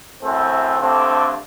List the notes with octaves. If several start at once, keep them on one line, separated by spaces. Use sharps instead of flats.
F#2 E3 A3 C4
G2 D3 A3 C4